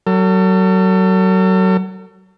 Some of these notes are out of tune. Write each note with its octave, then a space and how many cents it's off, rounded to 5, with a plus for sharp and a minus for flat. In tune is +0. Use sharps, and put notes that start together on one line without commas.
F#3 +25 A4 +40